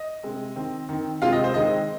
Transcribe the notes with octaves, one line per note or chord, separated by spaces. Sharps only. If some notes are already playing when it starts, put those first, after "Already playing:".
Already playing: D#5
C3 G#3 C4
D#3 C4
D#3 C4
C3 G#3 C4 F4 F5
D#5
C5
D#3 G#3 C4 D#5